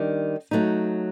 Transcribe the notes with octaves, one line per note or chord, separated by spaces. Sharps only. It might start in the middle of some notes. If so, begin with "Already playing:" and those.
Already playing: D#3 G3 D4
F#3 A3 D#4